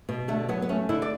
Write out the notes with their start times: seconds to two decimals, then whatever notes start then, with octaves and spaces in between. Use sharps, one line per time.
0.09 B2
0.28 D3 A3
0.49 F#3 B3
0.62 B3
0.69 A3 C#4
0.89 D3 E4
1.02 D5